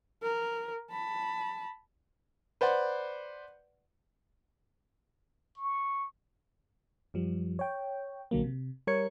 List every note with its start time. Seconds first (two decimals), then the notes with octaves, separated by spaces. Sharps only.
0.23 A#4
0.91 A5 B5
2.61 B4 C5 D5 F#5
5.57 C#6
7.14 F#2 F3 G3
7.59 C#5 G5
8.31 A#1 D3 F#3 A#3
8.44 C3
8.87 G3 A#4 C#5 G#6 C#7